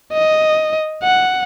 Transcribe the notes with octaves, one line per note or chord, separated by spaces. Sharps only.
D#5
F#5